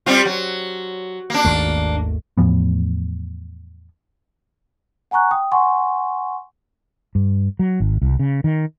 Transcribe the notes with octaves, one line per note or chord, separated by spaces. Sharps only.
G3 C4 F4
F#3
A#3 D4
G#1 D#2 A3
E2 A2 F3 B3
F#5 G#5 A#5 C#6 F#6
G5 D#6
F#5 G#5 C6 C#6
G2
F#3
G#1
C2
C#3
D#3